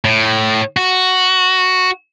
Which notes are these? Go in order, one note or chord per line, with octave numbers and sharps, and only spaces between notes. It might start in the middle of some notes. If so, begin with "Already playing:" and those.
A2
F#4